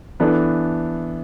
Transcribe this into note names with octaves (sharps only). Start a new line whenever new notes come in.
E3 B3 D4 A4